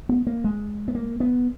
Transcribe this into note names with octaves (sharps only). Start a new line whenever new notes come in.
B3
A#3
G#3
B3
A#3
B3